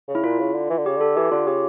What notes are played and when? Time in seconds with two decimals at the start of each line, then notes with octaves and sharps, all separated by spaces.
0.08 C#3
0.15 E4
0.24 A#2 F4
0.40 C#3
0.54 D3
0.70 E3
0.78 D3
0.86 C#3 G4
0.97 D3 A4
1.17 E3 G4
1.32 D3 F4
1.47 C#3 G4